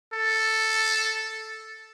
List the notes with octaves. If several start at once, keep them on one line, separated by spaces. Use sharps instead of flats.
A4